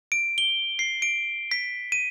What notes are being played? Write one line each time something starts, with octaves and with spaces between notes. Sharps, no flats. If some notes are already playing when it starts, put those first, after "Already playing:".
D7
G7
C7
D7
B6
D#7